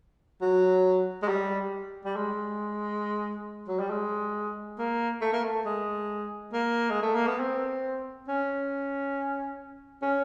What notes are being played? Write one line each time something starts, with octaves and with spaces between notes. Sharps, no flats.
F#3
G#3
G3
G3
G#3
F#3
G3
G#3
A#3
A3
A#3
A3
G#3
A#3
G#3
A3
A#3
B3
C4
C#4
C#4